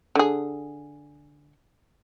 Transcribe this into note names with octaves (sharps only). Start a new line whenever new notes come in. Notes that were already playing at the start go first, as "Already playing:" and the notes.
D3 G#4